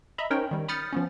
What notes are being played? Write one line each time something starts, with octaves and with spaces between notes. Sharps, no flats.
D#5 E5 A#5 B5
C#4 D#4 A#4 C5 C#5 G5
D#3 G3
B5 D#6 F6 G6 A6 C#7
F3 B3 C#4